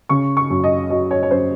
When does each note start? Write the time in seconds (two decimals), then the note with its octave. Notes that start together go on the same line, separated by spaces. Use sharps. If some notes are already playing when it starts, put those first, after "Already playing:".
0.09 C#3 C#6
0.37 C#6
0.50 F#2
0.64 D#5
0.90 F#3 D#5
1.11 C#5
1.23 C#5
1.31 F#2 C5